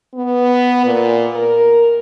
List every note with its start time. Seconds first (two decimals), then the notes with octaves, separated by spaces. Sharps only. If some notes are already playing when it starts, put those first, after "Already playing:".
0.14 B3
0.85 A#2
1.36 A#4